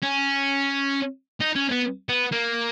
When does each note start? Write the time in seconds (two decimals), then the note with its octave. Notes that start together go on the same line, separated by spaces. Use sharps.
0.02 C#4
1.40 D#4
1.55 C#4
1.71 B3
2.09 B3
2.32 A#3